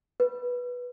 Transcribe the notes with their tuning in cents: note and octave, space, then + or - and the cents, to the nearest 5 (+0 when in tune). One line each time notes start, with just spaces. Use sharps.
B4 -10